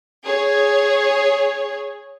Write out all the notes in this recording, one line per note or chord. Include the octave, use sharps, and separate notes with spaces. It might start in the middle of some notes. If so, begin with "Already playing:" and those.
G#4 C#5